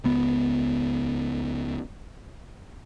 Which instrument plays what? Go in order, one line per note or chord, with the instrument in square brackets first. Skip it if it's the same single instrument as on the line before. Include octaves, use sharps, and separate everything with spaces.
[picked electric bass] C#2 B3